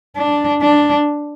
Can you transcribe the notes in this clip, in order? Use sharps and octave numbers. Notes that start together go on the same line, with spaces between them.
D4
D4